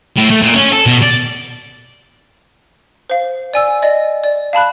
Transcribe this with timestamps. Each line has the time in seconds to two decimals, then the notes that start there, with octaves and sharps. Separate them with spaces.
0.16 A2
0.30 A3
0.42 A#2
0.54 C#4
0.72 A4
0.86 B2
1.03 D5
3.10 C5 F5
3.54 D5 G#5 E6
3.83 D5 D#5
4.24 D5
4.53 F5 A5 B5 F#6